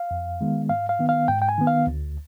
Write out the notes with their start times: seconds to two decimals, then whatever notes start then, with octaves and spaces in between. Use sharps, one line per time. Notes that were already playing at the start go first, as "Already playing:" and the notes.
Already playing: F5
0.11 F2
0.41 D#3 G#3 B3
0.69 G#2 F5
0.89 F5
1.00 D#3 B3
1.09 F5
1.28 G#2 G5
1.42 G5
1.49 G#5
1.58 D#3 B3
1.67 F5
1.87 D2